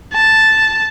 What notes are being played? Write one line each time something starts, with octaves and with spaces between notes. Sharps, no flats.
A5